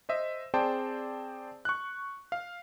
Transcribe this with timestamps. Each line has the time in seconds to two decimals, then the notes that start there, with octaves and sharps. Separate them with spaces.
0.09 C5 D#5 E5
0.54 C4 G#4 C5 D5 G5 A5
1.65 C#6 F#6
2.32 F5